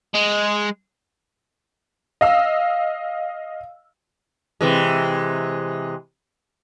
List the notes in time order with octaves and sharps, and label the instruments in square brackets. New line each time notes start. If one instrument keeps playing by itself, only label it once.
[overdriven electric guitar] G#3
[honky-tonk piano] D#5 F5 E6
[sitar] C3 E3 G#3